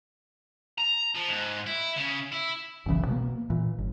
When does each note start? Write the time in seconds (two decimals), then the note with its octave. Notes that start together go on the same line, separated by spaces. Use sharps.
0.78 A#5
1.15 F3
1.29 G#2
1.66 E4
1.96 C#3
2.32 E4
2.86 F#1 B1 C#3 E3
3.07 B2 G#3 A#3
3.50 A#2 E3
3.78 G1